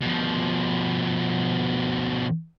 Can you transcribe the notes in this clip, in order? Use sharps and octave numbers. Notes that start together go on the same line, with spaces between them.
B2 F3